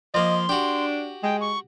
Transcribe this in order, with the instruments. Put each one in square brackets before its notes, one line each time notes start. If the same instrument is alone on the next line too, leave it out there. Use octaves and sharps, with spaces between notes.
[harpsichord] F3 A#3 [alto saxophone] D#5 [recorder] C6
[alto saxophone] D4 [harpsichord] F#4 G4
[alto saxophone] G#3 [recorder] G5
[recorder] C#6